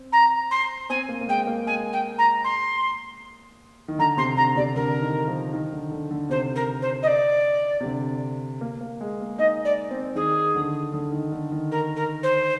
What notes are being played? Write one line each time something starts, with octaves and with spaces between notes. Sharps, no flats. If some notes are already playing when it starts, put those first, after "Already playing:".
Already playing: C4
A#5
C6
C4 G#5
A#3
A#3
G#3 G5
A#3
G#3 G#5
G5
A#5
C6
D#3
D3 A#5
C3 C6
D3 A#5
C3 D5
D3 A#4
D#3
F3
D#3
D3
D3
D3
C3 C5
A#4
C5
D#5
D5
C3
D3
A#3
A#3
G#3
A#3
D#4 D#5
D5
C4
D#3 G#4
D3
D3
D#3
D3
D#3
A#4
A#4
C5